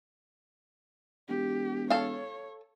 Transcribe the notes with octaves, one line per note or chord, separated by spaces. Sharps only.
E1 G4
A4 C#5 F5